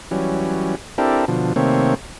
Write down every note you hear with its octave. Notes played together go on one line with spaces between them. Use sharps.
E3 F#3 G3 C#4
C4 D4 E4 G4 A4 A#4
B2 D3 F3
C3 D#3 A3 A#3 C4 C#5